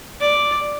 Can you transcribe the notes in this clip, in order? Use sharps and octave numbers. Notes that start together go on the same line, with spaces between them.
D5